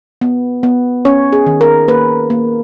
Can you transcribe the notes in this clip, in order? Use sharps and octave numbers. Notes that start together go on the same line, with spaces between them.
B3
B3
C#4 C#5
G#4
D#3
A#4
A#3 B4
A#3